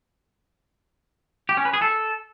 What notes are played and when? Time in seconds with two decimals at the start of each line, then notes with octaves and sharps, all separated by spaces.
1.49 G4
1.57 C#4
1.65 B4
1.74 G#4
1.82 A4